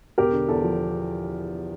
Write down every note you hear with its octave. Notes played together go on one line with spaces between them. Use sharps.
E1 G4 A#4
D3
E2 A4
F3